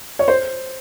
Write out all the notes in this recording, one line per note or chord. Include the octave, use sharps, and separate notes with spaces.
C#5
C5